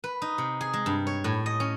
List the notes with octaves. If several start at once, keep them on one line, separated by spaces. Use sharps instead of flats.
B4
D#4
C3
G#4
G#3
G2
C#5
A2
D#5
C#4